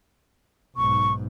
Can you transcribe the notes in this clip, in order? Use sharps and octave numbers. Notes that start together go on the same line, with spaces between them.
B1 G#2 C#6